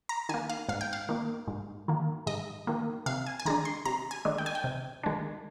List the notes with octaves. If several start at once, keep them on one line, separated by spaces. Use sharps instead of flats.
A#5
D#3 A#3 G#5
F5
G#2 F5
G5
F5
D#3 A#3
G#2
D#3 A#3
G#2 D#5
D#3 A#3
C3 F5
G#5
G#5
D#3 G#3 D4 A#5
C6
C3 A#5
G#5
D#3 G#3 D4
G5
G#5
G5
C3
D#3 G#3 D4